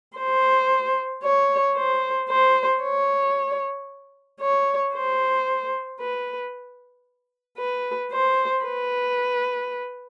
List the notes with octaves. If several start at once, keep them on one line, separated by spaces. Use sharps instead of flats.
C5
C#5
C5
C5
C#5
C#5
C5
B4
B4
C5
B4